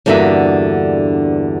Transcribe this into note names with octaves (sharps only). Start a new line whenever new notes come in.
E2 G2 D3 A#3 F#4 E5